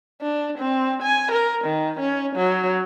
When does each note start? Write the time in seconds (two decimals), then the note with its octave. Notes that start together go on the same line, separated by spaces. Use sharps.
0.21 D4
0.58 C4
1.03 G#5
1.32 A#4
1.65 D#3
2.00 C#4
2.36 F#3